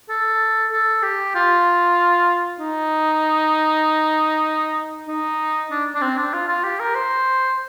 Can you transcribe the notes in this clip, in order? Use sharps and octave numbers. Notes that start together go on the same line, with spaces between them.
A4
A4
G4
F4
D#4
D#4
D4
D4
C4
D4
F4
F4
G4
A#4
C5